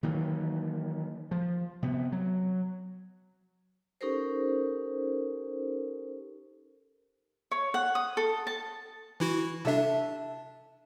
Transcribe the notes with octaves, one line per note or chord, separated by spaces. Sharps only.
D#3 E3 F#3 A#3
F3
C3 B3
F#3
C#4 D#4 G4 A4 A#4 C5
C#5
F#5
D#6
A4
A5
E3 E4 F#4
C3 D4 A4 E5